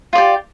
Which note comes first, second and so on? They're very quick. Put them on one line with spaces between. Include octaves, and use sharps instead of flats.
F4 D5 G4